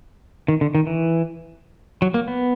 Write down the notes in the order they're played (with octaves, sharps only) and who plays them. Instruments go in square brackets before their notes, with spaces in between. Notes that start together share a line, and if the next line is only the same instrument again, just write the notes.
[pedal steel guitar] D#3
D3
D#3
E3
F#3
A#3
B3